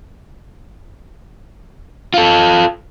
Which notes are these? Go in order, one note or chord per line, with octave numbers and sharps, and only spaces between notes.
F4 A4